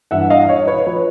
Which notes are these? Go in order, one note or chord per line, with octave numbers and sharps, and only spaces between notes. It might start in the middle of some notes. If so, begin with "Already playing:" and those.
G2 E3 E5 F#5
D#5 F5
C#5 D#5
B4 C#5
F3 B4